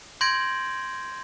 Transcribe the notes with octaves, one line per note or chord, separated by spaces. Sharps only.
C6 G6 G#6 A#6 D7 F#7